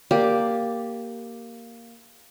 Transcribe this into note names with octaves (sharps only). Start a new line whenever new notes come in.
A#3 G4 D5